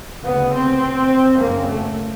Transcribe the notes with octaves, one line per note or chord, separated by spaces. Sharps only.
D2 C#3 B3
C4
F#1 F#2 C#3 A#3
A3